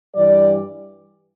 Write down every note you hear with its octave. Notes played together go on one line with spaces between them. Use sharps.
G2 E3 G3 D5